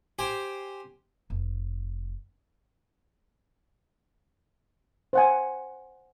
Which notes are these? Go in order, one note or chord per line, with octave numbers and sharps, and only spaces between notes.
G4 C5 G5 G#5
F1
C5 F#5 G#5